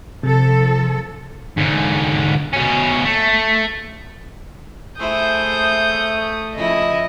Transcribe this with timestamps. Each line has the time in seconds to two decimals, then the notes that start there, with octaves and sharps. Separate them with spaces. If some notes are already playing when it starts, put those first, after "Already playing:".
0.23 C3 F3 A4
1.57 G#2 D3
2.53 B2 C#4
3.04 A3
5.00 A3 E4 G#4 C5 D#6 G6
6.56 C#3 F3 E4 D#5